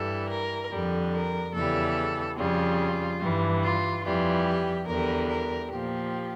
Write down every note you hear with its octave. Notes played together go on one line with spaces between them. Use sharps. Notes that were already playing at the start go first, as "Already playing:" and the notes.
Already playing: G2 E3 G3 A4
A#4
F2 D3 G3
A#4
E2 C#3 E3 G3 A4
F2 C#3 G3 F4
G2 E3 G3
F4
F2 E3 G3 F4
G4
E2 D3 G3 A#4
A#4
A#2 F3 G4